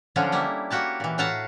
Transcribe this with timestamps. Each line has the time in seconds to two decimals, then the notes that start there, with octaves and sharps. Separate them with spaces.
0.16 D3 F3 F#3 C#4 D4
0.32 G3 A#3 E4
0.70 A#3 F#4 G4 A5
1.00 A#2 E3
1.18 A2 F#4 E5 F5 A5 A#5